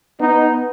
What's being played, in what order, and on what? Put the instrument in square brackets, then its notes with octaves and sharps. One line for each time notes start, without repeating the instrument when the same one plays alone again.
[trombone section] B3 D#4